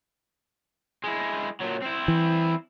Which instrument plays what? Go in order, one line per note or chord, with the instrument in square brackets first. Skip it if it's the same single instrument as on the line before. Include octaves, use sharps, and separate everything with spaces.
[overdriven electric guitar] G#3 E4
A#2 F#3
C4 E4
[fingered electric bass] E3